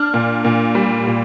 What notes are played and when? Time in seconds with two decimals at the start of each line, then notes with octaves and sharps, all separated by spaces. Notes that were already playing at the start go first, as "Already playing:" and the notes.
Already playing: D4 F6
0.14 A#2
0.44 A#2
0.75 G3
1.07 A#2